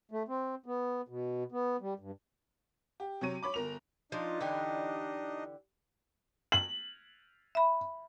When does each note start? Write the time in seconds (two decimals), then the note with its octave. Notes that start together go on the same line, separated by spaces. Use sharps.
0.11 A3
0.28 C4
0.66 B3
1.08 B2
1.52 B3
1.81 G3
1.99 G2
3.00 G4
3.21 C3 F#3 C#5 D#7
3.43 C#5 B5 D6
3.54 G1 A#4 F7
4.12 F3 D4 D#4 F4 D#5
4.41 D3 E3 G4
6.52 F#7
7.55 E5 B5